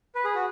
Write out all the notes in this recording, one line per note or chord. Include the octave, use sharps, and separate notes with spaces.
B4
G#4
F#4